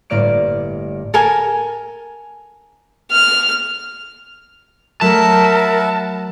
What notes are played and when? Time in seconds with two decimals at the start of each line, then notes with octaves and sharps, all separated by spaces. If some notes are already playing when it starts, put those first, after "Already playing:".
0.10 G1 A2 A#3 D5 F6 D7
1.14 A4 A#4 G#5
3.12 F6
5.01 F#3 A3 A4 A#4 E5 F#5 A5 B5